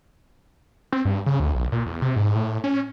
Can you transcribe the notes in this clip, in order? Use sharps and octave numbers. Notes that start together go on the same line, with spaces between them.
C4
G2
C#3
D2
B1
A#2
E2
C3
G#2
A2
C#4